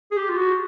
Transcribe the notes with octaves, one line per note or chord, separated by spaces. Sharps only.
G#4
G4
F4
F#4